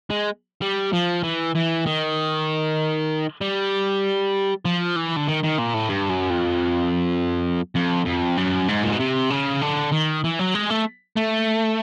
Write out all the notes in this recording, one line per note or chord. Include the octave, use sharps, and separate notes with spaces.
G#3
G3
F3
E3
E3
D#3
G3
F3
E3
D3
D#3
D#3
A#2
A2
G2
F#2
F2
F2
F2
F#2
G#2
A#2
B2
C3
C#3
D3
D#3
E3
F#3
G#3
A3
A3